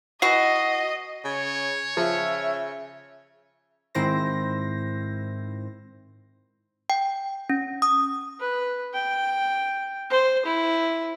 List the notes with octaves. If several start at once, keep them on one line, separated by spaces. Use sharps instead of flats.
E3 F#4 D#5 C7
C#3 C#5
C#3 F3 E5
G#2 D#3 C4 E4 C5 A#6
G5
C#4
D#6
B4
G5
C5
E4